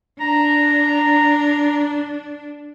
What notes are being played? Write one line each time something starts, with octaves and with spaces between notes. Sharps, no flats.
D4 A#5